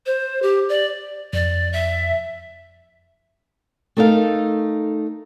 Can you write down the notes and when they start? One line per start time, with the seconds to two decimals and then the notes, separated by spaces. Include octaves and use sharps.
0.06 C5
0.42 G4
0.69 D5
1.33 F2 D5
1.73 E5
3.97 A3 D#4 A4 A#4 F5